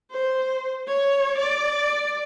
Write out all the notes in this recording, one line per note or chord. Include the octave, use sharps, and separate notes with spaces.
C5
C#5
D5